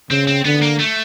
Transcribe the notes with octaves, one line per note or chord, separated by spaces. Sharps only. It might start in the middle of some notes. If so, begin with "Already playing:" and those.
C#3 C4
C4
D3 B3
A#3
A3